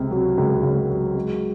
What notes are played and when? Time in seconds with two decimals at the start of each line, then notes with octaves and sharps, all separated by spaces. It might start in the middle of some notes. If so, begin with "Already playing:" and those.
Already playing: C#2 C3
0.11 F#3
0.38 C#2
0.63 C#2
0.89 F#3
1.15 G#3